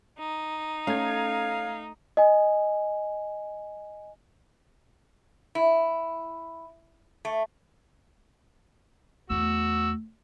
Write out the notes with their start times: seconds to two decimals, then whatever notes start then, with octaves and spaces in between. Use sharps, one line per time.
0.20 D#4
0.87 A3 C#4 F5 G#6
2.17 D#5 G#5
5.55 E4
7.25 A3
9.30 E2 A3 F#4 E6